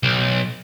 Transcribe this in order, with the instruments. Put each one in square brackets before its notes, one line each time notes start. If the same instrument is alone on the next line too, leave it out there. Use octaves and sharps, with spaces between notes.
[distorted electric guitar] B1